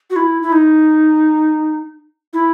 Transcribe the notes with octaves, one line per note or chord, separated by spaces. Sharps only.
F#4
E4
E4
D#4
E4